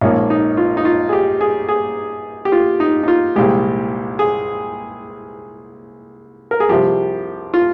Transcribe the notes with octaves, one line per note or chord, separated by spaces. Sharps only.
A#1 G#2 F3 A#3 C#4
D#4
F4
D#4
F4
G#4
G4
G#4
G#4
G4
F4
D#4
D#4
F4
C2 A#2 F3 G#3 G4
G#4
A#4
G#4
C2 C3 F3 G4
F4